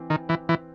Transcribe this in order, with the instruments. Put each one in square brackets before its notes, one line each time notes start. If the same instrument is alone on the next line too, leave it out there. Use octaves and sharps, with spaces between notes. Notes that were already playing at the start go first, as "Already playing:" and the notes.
Already playing: [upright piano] E3 C4
[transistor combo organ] D#3
E3
E3